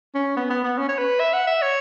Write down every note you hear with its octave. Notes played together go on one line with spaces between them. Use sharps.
C#4
B3
B3
B3
C#4
C#5
B4
E5
F#5
E5
C#5